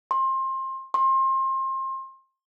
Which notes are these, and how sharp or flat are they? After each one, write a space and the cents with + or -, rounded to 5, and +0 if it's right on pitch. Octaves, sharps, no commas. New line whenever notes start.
C6 +25
C6 +30